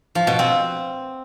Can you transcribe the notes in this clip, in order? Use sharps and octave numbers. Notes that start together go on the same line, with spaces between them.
F3
B2
C4